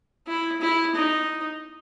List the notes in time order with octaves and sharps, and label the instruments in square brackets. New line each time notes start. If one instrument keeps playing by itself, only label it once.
[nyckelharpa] E4
E4
D#4